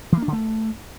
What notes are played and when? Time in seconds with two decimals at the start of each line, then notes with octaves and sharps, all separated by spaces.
0.12 E3
0.17 A#3
0.22 D4
0.28 D3
0.33 A3